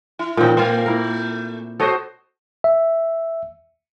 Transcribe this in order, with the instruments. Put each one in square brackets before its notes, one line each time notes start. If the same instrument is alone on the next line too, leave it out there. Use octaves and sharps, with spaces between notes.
[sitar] E4
[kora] A#2 C4 [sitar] D#3 C#4 D#4
[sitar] A3 [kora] F4 C5
[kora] E4 A#4
[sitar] F#4 C5 [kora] A4 C#5 D#5
[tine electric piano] E5